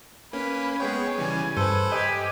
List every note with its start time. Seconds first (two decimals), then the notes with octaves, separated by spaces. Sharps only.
0.33 A#3 C#4 B4
0.80 G#3 B3 G#4 C#5 G5
1.18 C#3 E3 G3 G#5
1.57 G2 A4 B4 C5
1.92 G4 D#5 G#5